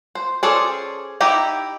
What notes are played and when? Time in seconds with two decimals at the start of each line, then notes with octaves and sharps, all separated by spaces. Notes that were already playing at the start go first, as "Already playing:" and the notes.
0.15 C5
0.43 C#4 G#4 A4 C5 D5
1.21 D#4 E4 G4 G5 A#5